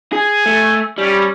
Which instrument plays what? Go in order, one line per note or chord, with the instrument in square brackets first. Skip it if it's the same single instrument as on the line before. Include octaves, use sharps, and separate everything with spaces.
[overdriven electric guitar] G#4 [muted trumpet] G#5
[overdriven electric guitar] A3
[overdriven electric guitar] G3 [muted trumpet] C#4